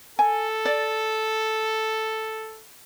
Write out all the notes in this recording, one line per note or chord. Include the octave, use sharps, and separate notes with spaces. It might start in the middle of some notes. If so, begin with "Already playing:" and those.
A4 G#5
D5